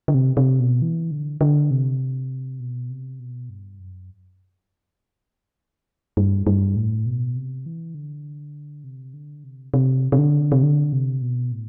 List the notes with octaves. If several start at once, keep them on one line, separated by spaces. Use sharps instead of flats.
D3
C3
C3
B2
E3
D3
D3
C3
B2
C3
B2
G2
F#2
G2
G2
A2
B2
C3
E3
D3
C3
D3
C3
C3
C3
D3
C3
D3
C3
B2
A2